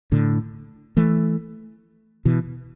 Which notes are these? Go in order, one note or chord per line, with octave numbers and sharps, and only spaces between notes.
A2 D3
E3 A3
B2 E3